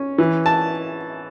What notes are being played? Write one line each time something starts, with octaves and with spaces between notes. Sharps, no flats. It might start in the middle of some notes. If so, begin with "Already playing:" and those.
Already playing: C#4
E3
A5